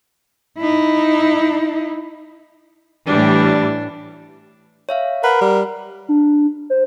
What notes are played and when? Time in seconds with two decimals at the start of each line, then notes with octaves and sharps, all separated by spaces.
0.59 D#4 E4
3.07 A2 E3 G3 D4
4.89 C#5 E5 F5
5.24 A#4 B4 F#5
5.41 G3
6.09 D4
6.70 C5